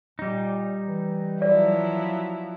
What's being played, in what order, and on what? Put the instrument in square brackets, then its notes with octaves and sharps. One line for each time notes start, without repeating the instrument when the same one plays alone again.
[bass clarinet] A#2 [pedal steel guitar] G3 D#4
[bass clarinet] E3
[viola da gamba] F3 F#3 E4 [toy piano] D5